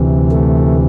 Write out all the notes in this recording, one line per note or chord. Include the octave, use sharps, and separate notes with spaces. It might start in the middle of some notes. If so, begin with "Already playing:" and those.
Already playing: D2 C3 E3
A3